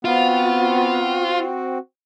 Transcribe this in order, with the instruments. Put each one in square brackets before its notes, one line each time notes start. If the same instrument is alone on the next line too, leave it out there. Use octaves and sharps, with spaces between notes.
[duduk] B3 [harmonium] C4 F#4 [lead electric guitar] F4